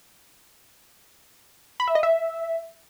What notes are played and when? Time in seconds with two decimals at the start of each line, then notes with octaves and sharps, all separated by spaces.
1.80 B5
1.88 E5
1.95 D#5
2.03 E5